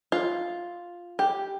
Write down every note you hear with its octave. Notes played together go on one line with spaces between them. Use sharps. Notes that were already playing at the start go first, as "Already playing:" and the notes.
F4
G4